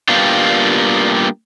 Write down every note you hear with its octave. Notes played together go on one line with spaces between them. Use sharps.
G3 A#3 B3 D4 F4 G4